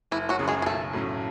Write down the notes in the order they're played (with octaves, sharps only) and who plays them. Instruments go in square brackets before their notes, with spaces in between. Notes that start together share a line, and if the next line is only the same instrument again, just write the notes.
[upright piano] F#1 [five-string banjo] E3 E4
[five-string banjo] F#3 F#4
[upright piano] F#2 C#3
[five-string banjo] G#3 G#4
G#4
[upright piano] B1 [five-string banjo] A3 A4
[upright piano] A2 F#3 C#4